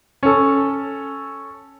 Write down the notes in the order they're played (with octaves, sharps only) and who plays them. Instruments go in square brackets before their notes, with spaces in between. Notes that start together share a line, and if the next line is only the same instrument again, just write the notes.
[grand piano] C#4 A4